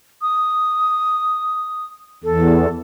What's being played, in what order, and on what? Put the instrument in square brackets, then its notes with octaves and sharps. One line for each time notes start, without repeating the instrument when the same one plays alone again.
[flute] D#6
[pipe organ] E2 [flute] A4